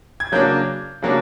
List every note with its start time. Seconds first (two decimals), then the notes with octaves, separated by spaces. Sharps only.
0.20 G#6
0.32 C#3 F#3 A#3 D4 G6
1.02 C#3 F#3 A#3 D4